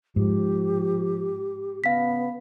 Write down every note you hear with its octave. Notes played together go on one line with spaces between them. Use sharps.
G#2 F3 G4
C#3 B3 F5 B6